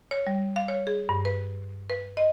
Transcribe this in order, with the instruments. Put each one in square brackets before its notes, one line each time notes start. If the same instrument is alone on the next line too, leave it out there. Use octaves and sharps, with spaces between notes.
[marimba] C#5
G3
F5
C#5
G#4
G2
B4
B4
D#5